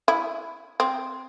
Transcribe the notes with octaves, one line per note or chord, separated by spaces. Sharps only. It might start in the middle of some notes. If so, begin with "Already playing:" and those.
E4
C4